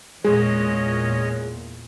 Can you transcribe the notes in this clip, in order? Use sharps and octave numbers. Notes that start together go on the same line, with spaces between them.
E2 A#2 G#3 C#4 G#4 C#5 D#5